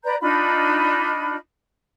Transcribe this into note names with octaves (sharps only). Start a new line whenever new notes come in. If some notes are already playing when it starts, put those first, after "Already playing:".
B4 D5 A#5 G6
D4 D#4 F4 B5